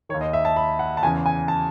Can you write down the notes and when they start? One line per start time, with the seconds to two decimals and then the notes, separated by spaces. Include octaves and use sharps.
0.09 D#3 C#5
0.14 D#2
0.21 D#5
0.33 E5
0.45 A5
0.56 B5
0.79 F#5
0.97 A5
1.03 E2 C#3 E3 G#5
1.26 G#5
1.48 A5